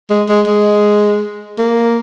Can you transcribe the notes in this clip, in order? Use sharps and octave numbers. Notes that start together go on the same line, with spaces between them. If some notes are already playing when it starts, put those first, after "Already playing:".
G#3
G#3
G#3
A#3